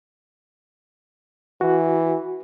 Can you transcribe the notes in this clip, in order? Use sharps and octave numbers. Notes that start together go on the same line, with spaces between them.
E3 F#4